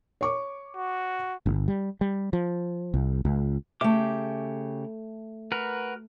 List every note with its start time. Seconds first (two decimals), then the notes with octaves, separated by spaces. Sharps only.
0.21 C#5 C#6 D6
0.76 F#4
1.46 G1
1.68 G3
2.01 G3
2.33 F3
2.94 C2
3.25 C#2
3.81 C#3 A3 G4 E5 D6
5.52 F#4 A#4 B4